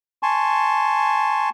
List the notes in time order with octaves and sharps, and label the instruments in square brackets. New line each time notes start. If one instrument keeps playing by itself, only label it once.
[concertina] G#5 A5 C6 C#6